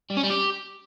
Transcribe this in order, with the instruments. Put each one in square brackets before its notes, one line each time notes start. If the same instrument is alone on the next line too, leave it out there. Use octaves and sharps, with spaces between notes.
[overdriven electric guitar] G3
C#4
G3
G4